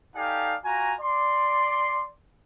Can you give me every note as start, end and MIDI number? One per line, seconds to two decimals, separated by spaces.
0.15 0.54 63
0.15 0.54 67
0.15 0.54 69
0.15 0.54 74
0.15 0.54 77
0.15 0.54 80
0.65 0.94 65
0.65 0.94 66
0.65 0.94 80
0.65 0.94 82
1.00 2.07 74
1.00 2.07 84